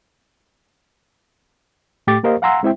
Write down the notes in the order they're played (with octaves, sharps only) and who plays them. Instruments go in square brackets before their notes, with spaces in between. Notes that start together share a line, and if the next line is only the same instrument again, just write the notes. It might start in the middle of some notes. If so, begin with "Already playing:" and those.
[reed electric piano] A2 A3 G4 G5 D6 A6
A#3 G4 A#4 C5 D#5 F5
F5 F#5 G#5 A#5 C6 E6
G#3 C4 E4 C5 E5 G5